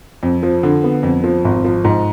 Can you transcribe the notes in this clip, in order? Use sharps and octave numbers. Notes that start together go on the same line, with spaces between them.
F2
F3
D3
B3
F2
F3
G#1
F3
G#2